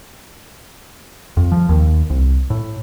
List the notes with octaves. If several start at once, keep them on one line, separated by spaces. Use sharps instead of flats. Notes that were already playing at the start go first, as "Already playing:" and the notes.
F2
F3
D#2
C2
A2